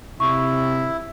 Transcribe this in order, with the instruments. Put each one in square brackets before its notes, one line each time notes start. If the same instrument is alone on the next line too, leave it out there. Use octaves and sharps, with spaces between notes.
[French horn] C3 [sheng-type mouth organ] E4 [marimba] C#6